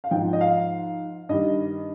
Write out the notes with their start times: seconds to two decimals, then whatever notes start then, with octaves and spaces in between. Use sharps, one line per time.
0.04 F5
0.11 G#2 F3 G5
0.33 D#5
0.41 F5
1.29 G2 D#3 G3 D#5